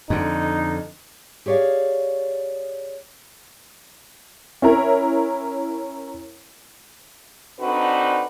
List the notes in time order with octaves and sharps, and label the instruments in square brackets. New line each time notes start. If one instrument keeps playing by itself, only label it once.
[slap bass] F2 D3 [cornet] D#4
[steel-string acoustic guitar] G4 G#4 C#5 D5 F5
[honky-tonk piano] C#4 E4 A#4 C#5
[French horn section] D3 C4 D4 D#4 F#4 B4